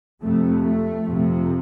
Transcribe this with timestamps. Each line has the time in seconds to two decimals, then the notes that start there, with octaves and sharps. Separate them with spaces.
0.22 F2 C3 A3
0.63 A3
1.04 F2 C3